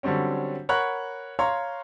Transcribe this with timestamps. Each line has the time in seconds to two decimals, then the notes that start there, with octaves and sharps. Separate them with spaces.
0.03 D3 F#3 G3 C4 C#4
0.69 A#4 C#5 F#5 B5 C#6 F#6
1.39 C#5 F5 A#5 C6 C#6